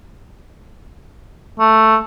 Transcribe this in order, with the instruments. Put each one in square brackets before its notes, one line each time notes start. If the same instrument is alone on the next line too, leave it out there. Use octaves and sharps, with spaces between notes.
[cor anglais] A3